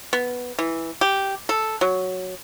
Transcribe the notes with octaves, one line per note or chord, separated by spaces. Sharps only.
B3
E3
G4
A4
F#3